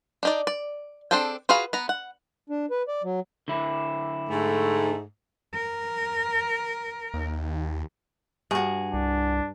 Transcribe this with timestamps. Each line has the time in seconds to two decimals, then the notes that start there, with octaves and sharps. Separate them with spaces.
0.23 D4 D#4 D5
0.47 D5
1.11 C4 D4 G#4 A4 G5
1.49 F4 F#4 G#4 B4 F5
1.73 B3 A#5
1.89 F#5
2.50 D4
2.71 B4
2.88 D5
3.04 F#3
3.48 D3 E4
4.30 G#2 A3
5.55 A#4
7.14 D#2
8.51 G2 F#4 G#4
8.93 C2 D4